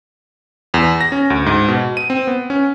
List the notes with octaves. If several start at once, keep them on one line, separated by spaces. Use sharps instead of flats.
E2
A#6
C#4
D2
G#2
B2
D#7
C4
B3
C#4